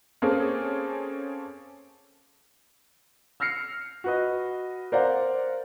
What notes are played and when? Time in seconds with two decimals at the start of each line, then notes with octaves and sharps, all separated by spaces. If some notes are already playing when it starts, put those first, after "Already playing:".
0.22 A#3 C4 C#4 G#4 A4
3.40 E6 F6 A#6 C7 C#7
4.04 F#4 B4 D#5
4.92 A#4 C5 D5 F5 F#5